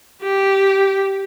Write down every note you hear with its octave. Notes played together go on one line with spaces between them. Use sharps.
G4